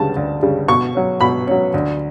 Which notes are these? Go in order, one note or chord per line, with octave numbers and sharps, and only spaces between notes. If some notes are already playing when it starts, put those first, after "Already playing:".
Already playing: D2 C#3 G3 A5
D2
C#3 G3
B2 C#6
F#3 C#4
B2 B5
F#3 C#4
D2